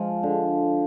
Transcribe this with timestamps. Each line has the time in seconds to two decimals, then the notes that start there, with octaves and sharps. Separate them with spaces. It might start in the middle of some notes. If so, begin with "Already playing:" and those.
Already playing: F3 G#3
0.23 D3